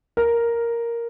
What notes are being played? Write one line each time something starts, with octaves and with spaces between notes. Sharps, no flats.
A#4